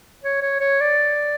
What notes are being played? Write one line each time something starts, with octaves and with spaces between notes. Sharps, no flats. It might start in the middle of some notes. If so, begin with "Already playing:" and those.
C#5
C#5
C#5
D5